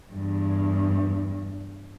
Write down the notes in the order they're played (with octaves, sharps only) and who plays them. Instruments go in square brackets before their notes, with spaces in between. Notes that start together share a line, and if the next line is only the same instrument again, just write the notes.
[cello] E2 G2